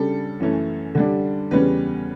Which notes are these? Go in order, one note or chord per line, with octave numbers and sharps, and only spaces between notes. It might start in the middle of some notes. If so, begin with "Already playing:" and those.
Already playing: C#3 G3 D4 A4
F#2 E3 A3 C#4
D3 G3 D4
E2 C#3 G3 C#4 B4